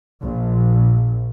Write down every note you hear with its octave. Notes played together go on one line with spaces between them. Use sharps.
A#1